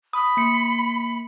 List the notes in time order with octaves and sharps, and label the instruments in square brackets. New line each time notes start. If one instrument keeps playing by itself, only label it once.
[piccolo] B5 [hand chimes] D#6
[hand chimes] A#3 C#7